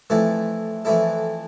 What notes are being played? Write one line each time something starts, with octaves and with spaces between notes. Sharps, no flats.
F2 E3 A3 E4 A4
F2 E3 A3 E4 A4